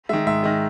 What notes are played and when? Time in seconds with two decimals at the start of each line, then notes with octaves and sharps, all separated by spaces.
0.09 D#3 G#3 E5
0.26 G#2 E5
0.43 D#3 G#3 D#5